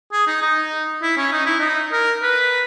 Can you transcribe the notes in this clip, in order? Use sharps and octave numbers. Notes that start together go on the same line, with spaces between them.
G#4
D#4
D#4
E4
C#4
D#4
E4
D#4
A#4
B4